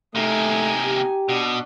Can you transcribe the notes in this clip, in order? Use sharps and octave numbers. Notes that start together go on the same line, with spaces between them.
C3 A3 A#3 D#4 G#5
G4
B2 D4